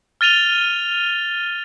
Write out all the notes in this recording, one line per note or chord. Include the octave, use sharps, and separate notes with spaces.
F6 A6 D#7 F7 G7